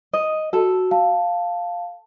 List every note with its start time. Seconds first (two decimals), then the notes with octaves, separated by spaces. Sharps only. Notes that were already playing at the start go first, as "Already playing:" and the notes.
0.13 D#5
0.53 F#4 A4
0.91 F5 A5